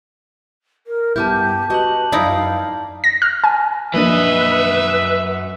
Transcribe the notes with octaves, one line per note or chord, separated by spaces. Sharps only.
A#4
G2 B3 E4 G4 A5 D6 G6
F#4 B4 D#5 A5 F#7
F#2 D#4 E4 D5 F5
A#6
F6
G#5
F#2 F3 A#3 D4 B4 D#5 E5